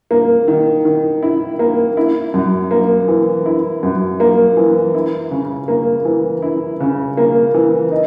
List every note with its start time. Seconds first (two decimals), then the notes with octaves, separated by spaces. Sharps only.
0.11 A#3
0.48 D#3
0.85 D#3
1.22 E4
1.59 A#3
1.97 E4
2.34 F#2
2.71 A#3
3.08 E3
3.46 E4
3.83 F#2
4.20 A#3
4.57 E3
4.94 E4
5.31 C#3
5.68 A#3
6.05 E3
6.42 E4
6.80 C#3
7.17 A#3
7.54 E3
7.91 D#4